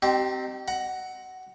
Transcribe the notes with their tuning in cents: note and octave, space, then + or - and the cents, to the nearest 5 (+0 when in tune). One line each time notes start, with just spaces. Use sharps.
C4 +0 D#4 -30 G4 -35
F#5 +10 A#5 +5